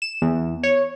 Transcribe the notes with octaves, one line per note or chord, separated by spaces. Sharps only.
E7
E2
C#5